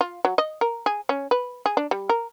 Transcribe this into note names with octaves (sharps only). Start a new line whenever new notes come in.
F4
F#3
D#5
A#4
G#4
C#4
B4
G#4
D4
G3
A#4